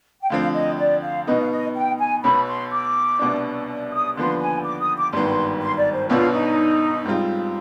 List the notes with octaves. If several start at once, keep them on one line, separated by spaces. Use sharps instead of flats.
G5
D2 D3 F3 C4 F5
D#5
D5
F5
B2 B3 D#4 D#5
F5
D#5
G5
G#5
B1 B2 B3 B5
C6
D6
C2 B2 B3 D4
D#6
D#2 D3 F3 B3 C6
G#5
D6
D#6
D6
G#1 G2 D#3 B3 C6
C6
D5
C5
B1 B2 B3 D4 F4
D#4
G#2 G3 C4 F4